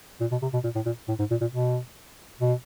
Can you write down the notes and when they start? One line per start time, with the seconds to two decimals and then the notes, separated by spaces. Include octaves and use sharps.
0.21 A#2
0.31 B2
0.42 C3
0.53 B2
0.64 A#2
0.75 A2
0.86 A#2
1.08 A2
1.19 G#2
1.31 A#2
1.41 A#2
1.52 B2
2.40 B2